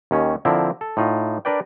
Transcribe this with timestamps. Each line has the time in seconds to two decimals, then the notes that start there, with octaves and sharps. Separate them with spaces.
0.11 D#2 D#3 C#4
0.45 D3 F3 C4 E4 A#4
0.81 A4
0.97 A2 D#4 F4
1.45 D4 A#4 B4 D5 G5